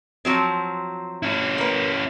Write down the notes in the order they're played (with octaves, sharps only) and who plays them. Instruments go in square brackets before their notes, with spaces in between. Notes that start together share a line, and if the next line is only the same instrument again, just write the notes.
[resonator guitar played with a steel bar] F3 F#3 C4
[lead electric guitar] C#4 E4
[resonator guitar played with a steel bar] A#3 B4